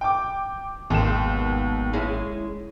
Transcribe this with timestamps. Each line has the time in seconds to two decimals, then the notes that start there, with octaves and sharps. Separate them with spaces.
0.01 G5 D6
0.90 G#1 D#2 B2 D#3 G#3 E7
1.93 G#3 C#4 E4